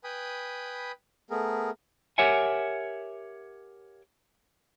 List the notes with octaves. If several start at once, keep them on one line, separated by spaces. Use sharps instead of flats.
B4 G5 G#5 B5 D#6
A3 B3 G#4 A#4
G4 A#4 C#5 E5 F#5 G#5